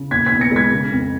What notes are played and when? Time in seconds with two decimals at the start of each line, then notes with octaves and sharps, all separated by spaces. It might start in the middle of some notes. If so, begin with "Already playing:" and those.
Already playing: C#3
0.11 A#2 G#6 B6
0.26 G#6 B6
0.32 B1
0.41 A#6 C#7
0.51 G#3 G#6 B6
0.71 C#3
0.91 F2